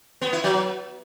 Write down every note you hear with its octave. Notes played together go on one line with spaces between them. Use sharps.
B3
E4
F#3